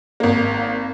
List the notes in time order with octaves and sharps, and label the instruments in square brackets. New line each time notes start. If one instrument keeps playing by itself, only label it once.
[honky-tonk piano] G#1 A#3